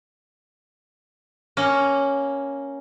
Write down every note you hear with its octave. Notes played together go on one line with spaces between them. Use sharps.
A#3 C#4